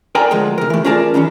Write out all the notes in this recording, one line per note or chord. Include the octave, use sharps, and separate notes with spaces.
A#4 D5 G5 G#5 A#5
D2 F3 G#3
C3 A#4
E3 A3
C#4 F4 G#4 A#4 D5 A5
D#3 E3 F#3 C#4